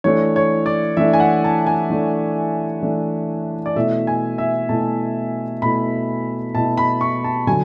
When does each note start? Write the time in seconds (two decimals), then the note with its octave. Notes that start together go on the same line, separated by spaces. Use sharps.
0.04 E3 A3 D4 C#5
0.36 C#5
0.66 D5
0.97 E3 A3 D4 E5
1.13 G#5
1.20 F#5
1.44 A5
1.67 G#5
1.90 E3 A3 D4
2.82 E3 A3 D4
3.66 D5
3.76 B2 A3 E4 E5
4.07 G#5
4.38 E5
4.69 B2 A3 E4 A5
5.62 B2 A3 E4 B5
6.55 B2 A3 E4 A5
6.77 B5
7.01 C#6
7.24 A5
7.47 D3 F#3 G#5